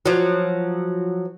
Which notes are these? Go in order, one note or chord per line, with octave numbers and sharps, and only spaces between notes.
F3 F#3